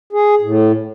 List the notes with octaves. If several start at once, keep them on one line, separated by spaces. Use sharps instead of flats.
G#4
A2